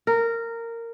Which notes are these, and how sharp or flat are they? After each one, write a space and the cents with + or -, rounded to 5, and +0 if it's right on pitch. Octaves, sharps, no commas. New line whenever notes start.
A#4 -15